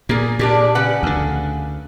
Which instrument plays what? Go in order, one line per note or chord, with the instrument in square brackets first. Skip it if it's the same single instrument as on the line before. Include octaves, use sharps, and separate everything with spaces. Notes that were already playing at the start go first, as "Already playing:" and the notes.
[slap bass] A#2 [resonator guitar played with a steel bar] A#3 G#4
[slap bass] A#2 [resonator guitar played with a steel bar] D4 G4 G#4
[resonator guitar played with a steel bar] C#3 B4 F#5
[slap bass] D2 D3